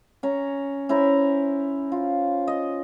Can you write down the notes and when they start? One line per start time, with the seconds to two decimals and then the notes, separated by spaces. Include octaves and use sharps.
0.23 C#4 A#5
0.89 C#4 E4 C5 A#5
1.92 F4
2.48 D#5